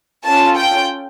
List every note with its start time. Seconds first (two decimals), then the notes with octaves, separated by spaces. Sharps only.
0.24 C#4 F4 A4 A5
0.56 G5